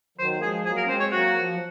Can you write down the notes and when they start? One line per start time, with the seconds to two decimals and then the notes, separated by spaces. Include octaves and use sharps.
0.18 D#3 F#3 C5
0.37 A#3
0.42 F3 G#3 G#4
0.65 F#3 A#3 G#4
0.77 A#4
0.84 C#4
0.89 G#3 C4 C5
1.00 C#5
1.12 F#3 A#3 F#4
1.36 F3
1.54 F#3